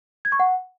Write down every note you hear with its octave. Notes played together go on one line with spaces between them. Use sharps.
G#6
C#6
F#5